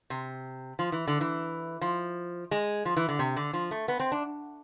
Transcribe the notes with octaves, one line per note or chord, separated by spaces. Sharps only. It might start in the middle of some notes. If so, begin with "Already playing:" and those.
C3
F3
E3
D3
E3
F3
G#3
F3
E3
D3
C3
D3
F3
A3
B3
C4
D4